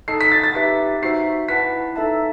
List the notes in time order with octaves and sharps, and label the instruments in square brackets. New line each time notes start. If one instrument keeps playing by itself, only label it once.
[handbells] D#4 A4 D#5 A5 [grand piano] C7
[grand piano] B6
A6
A6
[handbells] D#4 G4 B4 E5 [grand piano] B6
[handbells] D#4 F#4 C5 E5 [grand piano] C7
[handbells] E4 B4 F#5 A5 [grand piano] B6
[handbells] D#4 A4 E5 A5